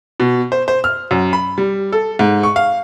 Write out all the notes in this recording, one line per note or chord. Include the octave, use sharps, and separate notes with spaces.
B2
C5
C5
F6
F#2
B5
G3
A4
G#2
C#6
F5